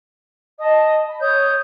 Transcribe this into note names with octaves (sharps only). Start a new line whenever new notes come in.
D#5 A5 D#6
B5
C#5 D#6 G6